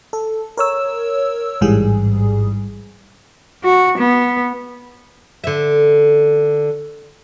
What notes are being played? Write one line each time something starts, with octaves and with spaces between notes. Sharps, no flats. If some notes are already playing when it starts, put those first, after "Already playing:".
A4
A#4 C#5 E6
A1 G#2 E3 G3 G#4
F#4
B3
D3 E5